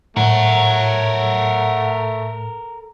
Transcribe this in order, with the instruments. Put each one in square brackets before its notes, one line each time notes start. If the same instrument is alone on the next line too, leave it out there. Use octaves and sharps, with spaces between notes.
[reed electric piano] A2 [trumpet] A3 [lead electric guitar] A4 A#4 [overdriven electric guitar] C#5 F#5